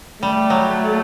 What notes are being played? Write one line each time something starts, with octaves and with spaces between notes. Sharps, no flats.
G3 A3
F#3